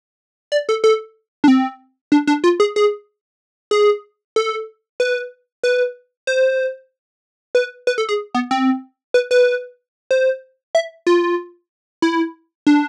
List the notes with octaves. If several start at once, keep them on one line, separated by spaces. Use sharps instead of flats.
D5
A4
A4
D4
C4
D4
D4
F4
G#4
G#4
G#4
A4
B4
B4
C5
B4
B4
A4
G#4
B3
C4
B4
B4
C5
E5
F4
E4
D4